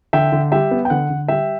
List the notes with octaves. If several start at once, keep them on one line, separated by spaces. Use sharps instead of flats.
D3 E5 G5
D3
G3 E5 G5
B3
G5
D3 F#5
D3
G3 E5 G5